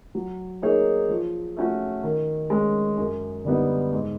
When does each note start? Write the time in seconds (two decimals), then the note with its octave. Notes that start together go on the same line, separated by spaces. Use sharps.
0.15 F#3
0.62 A#3 D#4 G#4 C#5
1.09 F3
1.57 A3 C#4 F#4
2.03 D#3
2.50 G#3 C#4
2.98 F#2
3.45 D3 G3 B3 D#4
3.92 G#2